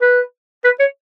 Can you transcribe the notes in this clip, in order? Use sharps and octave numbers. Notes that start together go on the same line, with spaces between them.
B4
B4
C#5